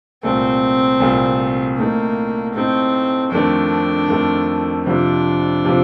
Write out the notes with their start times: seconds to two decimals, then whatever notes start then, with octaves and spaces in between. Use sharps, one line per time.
0.23 C2 A#2 A3 C4
1.00 C2 A#2 A3
1.77 A2 A3 A#3 D#4
2.54 A2 A3 C4 D#4
3.31 F2 D#3 A3 D4
4.09 F2 D#3 A3
4.86 F2 C3 F3 D4
5.65 C3 F3